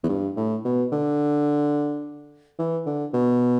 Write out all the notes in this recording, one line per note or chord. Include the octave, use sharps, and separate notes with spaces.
E2
G2
A2
B2
D3
E3
D3
B2